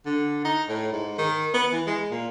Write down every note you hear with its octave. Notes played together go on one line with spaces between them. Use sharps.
D3
D#4
A2
G#2
D#3
B3
E3
G#3
A#2